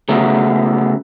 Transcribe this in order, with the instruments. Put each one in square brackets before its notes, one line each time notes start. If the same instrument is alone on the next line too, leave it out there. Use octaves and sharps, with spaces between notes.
[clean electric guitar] C#3 F#3 A3 B3